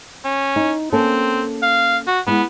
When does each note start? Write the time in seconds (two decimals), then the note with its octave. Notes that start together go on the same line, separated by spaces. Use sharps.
0.25 C#4
0.56 D#4
0.92 A#3 C4 C#4 A4
1.63 F5
2.07 F#4
2.27 G#3 B3 E4 F#5